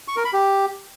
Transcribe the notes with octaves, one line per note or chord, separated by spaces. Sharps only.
C#6
A#4
B5
G4